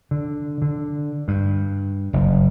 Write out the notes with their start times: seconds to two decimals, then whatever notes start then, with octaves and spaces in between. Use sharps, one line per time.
0.11 D3
0.62 D3
1.28 G2
2.13 F#1